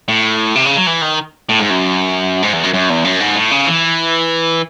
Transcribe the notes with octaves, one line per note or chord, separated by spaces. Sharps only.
A2
C3
C#3
F#3
E3
D#3
A2
G#2
F#2
G#2
E2
F#2
F#2
E2
F#2
G#2
A2
C#3
E3